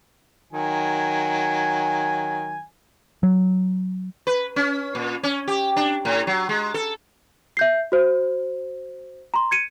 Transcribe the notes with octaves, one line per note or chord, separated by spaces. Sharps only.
D#3 F#3 G#5
F#3
B4
C#4
A#2
C#4
G4
D4
A2
F#3
G#3
A4
E5 G6 C7
F#4 C5
A#5 C6
G#6 C#7 D#7